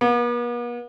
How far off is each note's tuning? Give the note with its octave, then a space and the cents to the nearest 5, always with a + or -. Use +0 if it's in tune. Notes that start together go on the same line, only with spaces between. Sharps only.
B3 -45